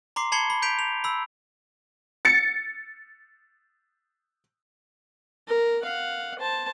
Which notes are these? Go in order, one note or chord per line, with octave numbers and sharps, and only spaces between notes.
A#5 C6 D6 C7
A5 B5 G#6 C7 C#7 G7
B5
G6 B6 D7 F7
G6 F7
B5 E6
A6 C#7
A#4
F5 F#5
C5 A5